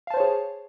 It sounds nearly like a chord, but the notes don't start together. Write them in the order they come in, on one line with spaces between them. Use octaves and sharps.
F5 A5 C5 C#5 G#4